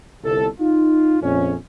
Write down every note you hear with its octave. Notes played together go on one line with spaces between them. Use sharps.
G1 C2 A4
D#4 F4
A#1 F2 C#4